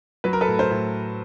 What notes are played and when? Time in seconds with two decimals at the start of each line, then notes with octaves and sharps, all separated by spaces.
0.24 F#3 B4
0.33 A#4
0.41 A4 B4
0.48 A2
0.59 A#4 C5
0.71 A2